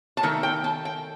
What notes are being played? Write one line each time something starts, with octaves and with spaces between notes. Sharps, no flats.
A5
D#3 A3 G5
G5
A5
G5